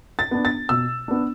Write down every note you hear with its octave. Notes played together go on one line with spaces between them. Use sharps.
A6
B3 D4
A6
B2 E6
B3 D4